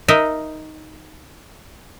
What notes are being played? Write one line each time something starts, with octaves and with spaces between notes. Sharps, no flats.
D#4 A#4 D#5 E5